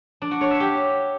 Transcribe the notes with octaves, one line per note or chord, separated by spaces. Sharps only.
D4
F#4
C#5
E5
G4